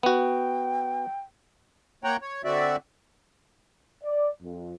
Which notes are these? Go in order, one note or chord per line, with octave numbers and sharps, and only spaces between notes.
B3 F#4 G5
A#3 C#5 F#5 G5 A#5
C#5
D3 C4 F#4 D5 E5
D5
F2